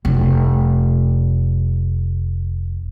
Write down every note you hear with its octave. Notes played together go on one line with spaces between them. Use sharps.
F1 G3